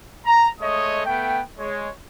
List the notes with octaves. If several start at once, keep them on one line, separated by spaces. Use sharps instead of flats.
A#5
G#3 A3 C#5 D#5 D#6
A3 B3 G5
G#3 C#5